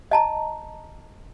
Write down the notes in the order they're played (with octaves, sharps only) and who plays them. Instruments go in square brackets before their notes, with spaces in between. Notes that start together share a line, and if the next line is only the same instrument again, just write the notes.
[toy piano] D#5 A5 A#5